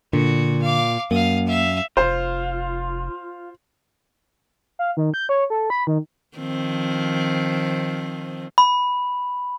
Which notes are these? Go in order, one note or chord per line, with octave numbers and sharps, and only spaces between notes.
A#2 D3 F#4
F5 D6
F#2 A#3 F5 D#6
E5 F5
F1 F4 C5
F5
D#3
G6
C#5
A4
B5
D#3
D#3 F3 C4
B5